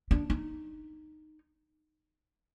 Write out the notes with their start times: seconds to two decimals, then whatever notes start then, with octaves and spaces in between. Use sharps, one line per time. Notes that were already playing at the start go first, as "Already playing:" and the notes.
0.11 D4
0.30 D#4